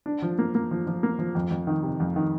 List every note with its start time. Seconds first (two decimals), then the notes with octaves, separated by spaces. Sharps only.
0.06 D4
0.22 F3
0.39 A#3
0.55 A#3
0.71 F3
0.87 F3
1.03 A#3
1.19 F3
1.35 F2
1.51 F2
1.67 D#3
1.83 C3
2.00 F2
2.16 D#3